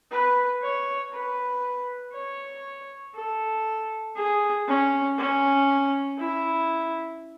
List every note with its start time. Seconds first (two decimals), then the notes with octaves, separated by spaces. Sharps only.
0.11 B4
0.62 C#5
1.13 B4
2.13 C#5
3.15 A4
4.16 G#4
4.68 C#4
5.18 C#4
6.19 E4